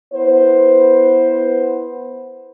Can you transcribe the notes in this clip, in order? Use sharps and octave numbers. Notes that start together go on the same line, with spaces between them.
B3 E4 B4 C5